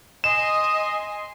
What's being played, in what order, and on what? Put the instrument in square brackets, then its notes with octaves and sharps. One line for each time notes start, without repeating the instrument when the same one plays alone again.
[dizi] D#5 [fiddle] G#5 C6 [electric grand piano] E7